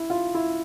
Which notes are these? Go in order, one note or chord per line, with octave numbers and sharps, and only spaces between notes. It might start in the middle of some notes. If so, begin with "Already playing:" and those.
Already playing: E4
F4
E4